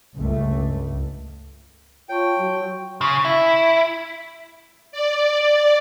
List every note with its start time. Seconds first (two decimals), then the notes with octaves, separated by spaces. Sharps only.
0.16 C#2 G2 A3
2.09 F4 C#5 G5 A5 C#6
2.38 F#3
3.01 C#3
3.25 E4
4.92 D5